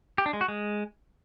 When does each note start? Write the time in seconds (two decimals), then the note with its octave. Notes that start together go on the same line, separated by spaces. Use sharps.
0.18 G4
0.26 D4
0.33 G#3
0.41 F#4
0.48 G#3